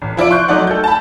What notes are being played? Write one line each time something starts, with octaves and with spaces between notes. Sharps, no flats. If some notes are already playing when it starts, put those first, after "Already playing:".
A1
F3 E4 D5 D7
C6 C#6 F#6 G6
F#3 A3 D#4 D5 F#5
A4 G6
A5 B5